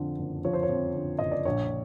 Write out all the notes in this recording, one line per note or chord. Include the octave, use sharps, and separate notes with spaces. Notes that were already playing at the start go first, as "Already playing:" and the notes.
Already playing: F2 D3 F3
F#1
F3 C#5
C5
C#5
F2
D3
F#1 D#5
D5
A#1 C#5